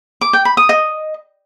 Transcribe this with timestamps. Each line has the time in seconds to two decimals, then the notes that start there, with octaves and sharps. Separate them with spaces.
0.21 D6
0.33 G5
0.45 B5
0.57 D#6
0.69 D#5